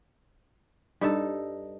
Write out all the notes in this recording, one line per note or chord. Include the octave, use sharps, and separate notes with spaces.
G2 D#4 A4